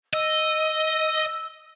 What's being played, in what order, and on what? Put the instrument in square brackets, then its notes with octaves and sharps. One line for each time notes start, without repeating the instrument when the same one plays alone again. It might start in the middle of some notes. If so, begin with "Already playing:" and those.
[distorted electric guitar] D#5 [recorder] E6